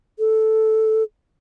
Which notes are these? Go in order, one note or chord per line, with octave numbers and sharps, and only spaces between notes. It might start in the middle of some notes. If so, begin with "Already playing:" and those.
A4